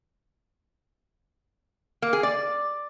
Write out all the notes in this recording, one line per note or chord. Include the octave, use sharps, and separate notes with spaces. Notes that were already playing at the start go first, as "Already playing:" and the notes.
A#3
G#4
D5